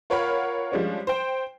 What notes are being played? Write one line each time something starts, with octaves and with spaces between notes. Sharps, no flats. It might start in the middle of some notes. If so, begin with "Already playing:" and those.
F4 A#4 C#5 F5 F#5 B5
F3 G3 G#3 C#4 D4
C5 G5